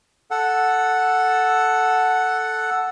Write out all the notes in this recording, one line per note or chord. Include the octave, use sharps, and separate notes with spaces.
A4 F#5